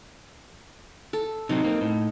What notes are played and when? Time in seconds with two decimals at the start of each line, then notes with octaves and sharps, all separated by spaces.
1.13 A4
1.49 C3 F#3 C4 D#4
1.65 A#3 C4
1.81 A2